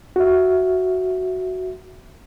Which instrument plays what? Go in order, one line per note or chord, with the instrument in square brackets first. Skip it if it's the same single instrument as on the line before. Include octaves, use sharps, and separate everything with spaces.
[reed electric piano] F#4 E5